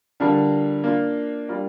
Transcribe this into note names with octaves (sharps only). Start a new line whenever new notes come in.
D3 G3 D4 F4 A#4
A#3 D4 F4
G3 D4 F4 A#4 D5